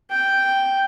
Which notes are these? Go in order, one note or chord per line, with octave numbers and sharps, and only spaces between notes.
G5